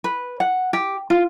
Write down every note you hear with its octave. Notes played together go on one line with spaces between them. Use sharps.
B4
F#5
G4
F4